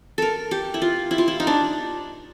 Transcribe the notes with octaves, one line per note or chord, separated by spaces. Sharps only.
A4 A#4
G4
E4
F4
E4
F4
E4
D#4
D4